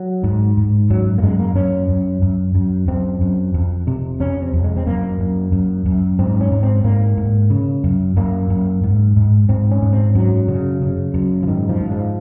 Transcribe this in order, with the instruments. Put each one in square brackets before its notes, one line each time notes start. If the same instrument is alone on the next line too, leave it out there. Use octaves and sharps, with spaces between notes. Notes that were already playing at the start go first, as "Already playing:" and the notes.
Already playing: [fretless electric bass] F#3
G#2
G#2
F#2 F#3
A#3
F#2 G#3
A#3
F#2 C#4
F#2
F#2
F#2
F#2 C4
F#2
F2
C3
F2 C#4
C4
F2
G#3
C4
F#2 A#3
F#2
F#2
F#2
G#2 C4
C#4
G#2
C4
G#2 A#3
G#2
C#3
F#2
F#2 A#3
F#2
G#2
G#2
G#2 C4
C#4
G#2
C4
F#2 F#3
C#3
C#3
F#2
F3
G#2 D#3
F3
G#2
F3